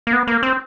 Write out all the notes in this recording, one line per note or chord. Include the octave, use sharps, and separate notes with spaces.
A#3
B3
A#3
C4